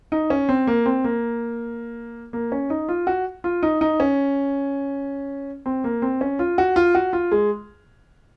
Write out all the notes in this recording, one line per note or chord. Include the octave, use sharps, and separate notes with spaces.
D#4
C#4
C4
A#3
C4
A#3
A#3
C#4
D#4
F4
F#4
F4
D#4
D#4
C#4
C4
A#3
C4
C#4
F4
F#4
F4
F#4
F4
G#3